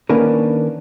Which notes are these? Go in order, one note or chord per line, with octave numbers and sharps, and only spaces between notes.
D#3 A#3 C#4 D4 A#4 B4